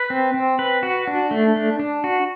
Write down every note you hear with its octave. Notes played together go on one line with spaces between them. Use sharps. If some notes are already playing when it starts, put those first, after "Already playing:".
Already playing: B4
C4
C4
B4
F#4
D4
A3
D4
D4
F#4